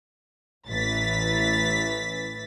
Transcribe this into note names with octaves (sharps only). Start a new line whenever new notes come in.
A1 E3 A6 B6